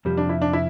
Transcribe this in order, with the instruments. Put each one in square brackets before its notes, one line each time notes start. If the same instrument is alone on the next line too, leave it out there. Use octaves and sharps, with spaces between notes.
[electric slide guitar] F2 C3 F3 [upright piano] G3
[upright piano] D4
E4
D4
E4